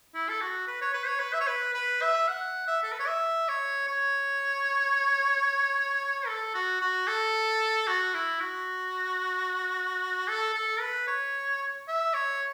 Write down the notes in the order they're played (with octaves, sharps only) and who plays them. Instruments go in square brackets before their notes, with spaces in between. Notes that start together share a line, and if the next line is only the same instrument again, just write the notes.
[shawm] E4
A4
F#4
B4
C#5
B4
C#5
B4
E5
C#5
B4
B4
E5
F#5
E5
A4
B4
C#5
E5
C#5
C#5
A4
F#4
F#4
A4
F#4
E4
F#4
A4
A4
B4
C#5
E5
C#5